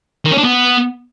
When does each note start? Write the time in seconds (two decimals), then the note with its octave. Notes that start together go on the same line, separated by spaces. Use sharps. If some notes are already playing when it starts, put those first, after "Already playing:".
0.25 D#3
0.31 C#4
0.38 D4
0.44 B3